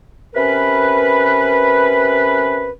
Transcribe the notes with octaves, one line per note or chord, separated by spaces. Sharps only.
C3 C#4 A#4 B4